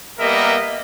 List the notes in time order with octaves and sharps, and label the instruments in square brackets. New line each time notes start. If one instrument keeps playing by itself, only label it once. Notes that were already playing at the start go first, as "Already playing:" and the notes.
[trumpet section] G3 A#3 B3 A#4 D#5 E5